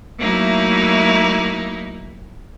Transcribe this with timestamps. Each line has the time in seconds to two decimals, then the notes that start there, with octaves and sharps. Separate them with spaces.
0.19 F#3 A3 A#3 D#4 E4